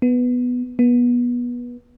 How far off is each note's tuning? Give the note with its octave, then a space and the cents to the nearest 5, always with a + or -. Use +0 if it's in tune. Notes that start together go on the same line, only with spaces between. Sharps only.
B3 +0
B3 -25